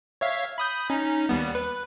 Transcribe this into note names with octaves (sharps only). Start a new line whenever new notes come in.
C#5 E5 F5
B5 D#6 G6
C#4 D#4
D#2 G3 B3
B4